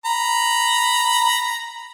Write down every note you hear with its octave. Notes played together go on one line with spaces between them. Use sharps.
A#5 B5